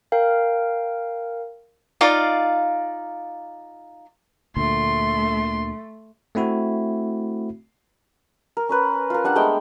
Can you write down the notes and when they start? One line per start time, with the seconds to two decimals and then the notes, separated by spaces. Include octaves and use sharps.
0.12 A#4 F5 G5
2.01 D#4 F4 D5 F5
4.57 D2 A#2 D3 A3 C6
6.35 A3 C4 E4 F#4
8.57 A#4
8.69 C#4 A#4 B4
9.10 F4 A#4
9.24 G3 D4 F#5
9.36 G#3 A3 B3 G5